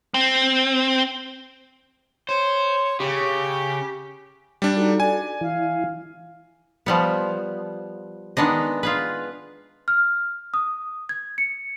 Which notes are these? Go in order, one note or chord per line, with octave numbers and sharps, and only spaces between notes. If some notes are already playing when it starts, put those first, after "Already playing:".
C4
C5 C#5
C#3 G4
G3 D4
D#4 F#4 A4
D5 G#5
E3 E4 F5
F3 G3 B3
D#3 G#3 B3 D4 D#5
F4 G#4 B4
F6
D#6
G#6
C#7